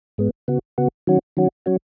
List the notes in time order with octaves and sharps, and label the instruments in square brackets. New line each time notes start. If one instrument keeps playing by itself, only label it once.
[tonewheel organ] G#2 G#3 B3
C#3 B3 F#4
C#3 B3 F#4
D#3 F#3 C#4 F#4
D#3 F#3 C#4 F#4
F#3 C#4 F#4